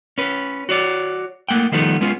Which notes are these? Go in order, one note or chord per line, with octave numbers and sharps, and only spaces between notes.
C#4 B4
F#4 C#5 D5
A3 A#3 F#5 G5
D#3 F3 G3 A3 B3 D#4
G#3 B3 C#4 F4